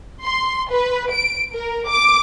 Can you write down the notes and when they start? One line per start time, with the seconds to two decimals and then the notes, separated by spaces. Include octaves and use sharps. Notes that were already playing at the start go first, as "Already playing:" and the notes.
0.23 C6
0.69 B4
1.12 D7
1.53 A#4
1.87 D6